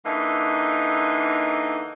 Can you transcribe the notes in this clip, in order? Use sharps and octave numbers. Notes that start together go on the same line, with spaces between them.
D3 E3 A#3 D#4